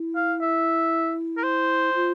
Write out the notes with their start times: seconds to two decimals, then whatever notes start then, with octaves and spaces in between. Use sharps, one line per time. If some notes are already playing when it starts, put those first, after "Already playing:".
Already playing: E4
0.16 F5
0.41 E5
1.37 A#4
1.43 C5
1.94 F4